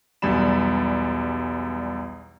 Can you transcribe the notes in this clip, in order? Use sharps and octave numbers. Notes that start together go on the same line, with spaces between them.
B1 E2 G3 D5 B5 E7